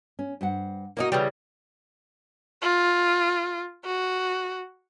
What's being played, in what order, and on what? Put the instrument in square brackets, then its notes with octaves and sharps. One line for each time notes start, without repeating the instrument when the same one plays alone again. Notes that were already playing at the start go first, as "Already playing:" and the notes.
[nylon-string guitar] C#4
G2 C5 F#5
[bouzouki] A#3 C#4 D#4 [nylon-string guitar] E4 F#4
[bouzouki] C#3 E3 G3
[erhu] F4
F#4